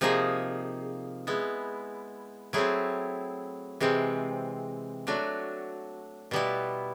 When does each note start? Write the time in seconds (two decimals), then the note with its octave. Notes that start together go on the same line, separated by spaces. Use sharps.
0.01 C3 F3 A#3 D#4 G#4
1.27 G#3 B3 E4
2.53 F#3 A3 C4 E4 G#4
3.80 C3 E3 G#3 C4
5.07 F#3 A3 D4 F#4
6.31 B2 G3 B3 E4